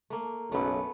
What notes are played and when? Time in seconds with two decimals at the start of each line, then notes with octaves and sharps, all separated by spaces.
0.10 A3 A#3
0.52 B1 F#2 C#3 A3 B3